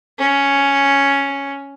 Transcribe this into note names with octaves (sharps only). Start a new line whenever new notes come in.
C#4